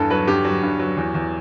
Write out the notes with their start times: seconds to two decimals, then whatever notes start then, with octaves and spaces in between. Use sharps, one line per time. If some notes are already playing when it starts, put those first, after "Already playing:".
Already playing: E2 G2 A4
0.10 F#3 B4
0.27 G2 G4
0.44 F#3
0.63 G2
0.79 F#3
0.97 E2
1.14 E2